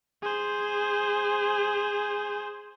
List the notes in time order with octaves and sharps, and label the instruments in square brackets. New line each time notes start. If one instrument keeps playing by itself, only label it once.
[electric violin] G#4 C5